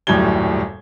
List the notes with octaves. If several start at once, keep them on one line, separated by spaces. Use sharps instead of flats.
D#1 F#2 A2 G3 G#6 G7